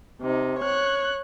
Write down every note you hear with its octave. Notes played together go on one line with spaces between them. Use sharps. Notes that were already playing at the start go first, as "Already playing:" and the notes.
C3 D#4
C#5 F#6